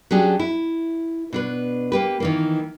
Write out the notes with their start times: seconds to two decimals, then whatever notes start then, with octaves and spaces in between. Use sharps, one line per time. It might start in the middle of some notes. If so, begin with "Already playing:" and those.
0.11 F#3 C#4 D4 G4 G#4
0.39 E4
1.33 B2 D4 B4
1.92 A#3 G4 B4
2.20 D#3 E3 A#3